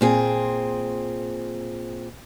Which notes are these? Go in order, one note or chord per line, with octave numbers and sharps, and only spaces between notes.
A#2 C4 G#4